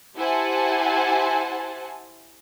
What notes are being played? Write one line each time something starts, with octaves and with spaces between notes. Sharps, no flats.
E4 G4 C5 F#5 G#5 A5